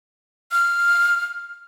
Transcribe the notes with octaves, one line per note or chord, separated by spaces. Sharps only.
F6